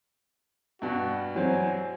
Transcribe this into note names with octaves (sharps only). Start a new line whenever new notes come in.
G2 B2 F#4
E3 F#3 C4 G#5